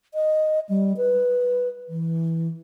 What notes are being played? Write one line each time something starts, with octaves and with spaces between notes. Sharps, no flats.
D#5
G3
B4
E3